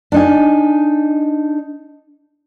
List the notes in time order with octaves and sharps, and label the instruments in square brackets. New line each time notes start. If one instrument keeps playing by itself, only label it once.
[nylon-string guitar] D4 D#4 G#5